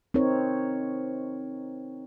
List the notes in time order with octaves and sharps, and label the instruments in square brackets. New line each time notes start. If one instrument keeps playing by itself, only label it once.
[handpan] C4 D#4 A#4 C#5